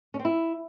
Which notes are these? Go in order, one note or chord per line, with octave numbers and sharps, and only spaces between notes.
C#4
C4
E4